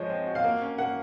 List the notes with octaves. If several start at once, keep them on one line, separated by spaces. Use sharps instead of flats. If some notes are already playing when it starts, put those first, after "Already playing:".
Already playing: F3 G#3 C#5 D#5
C4
F#4
F5
A#3
C#4
A#3 F#5